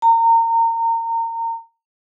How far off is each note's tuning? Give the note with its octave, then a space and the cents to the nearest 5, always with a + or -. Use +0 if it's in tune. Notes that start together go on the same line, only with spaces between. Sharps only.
A#5 -30